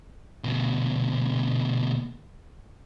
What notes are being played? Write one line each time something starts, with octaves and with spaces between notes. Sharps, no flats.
D2 B2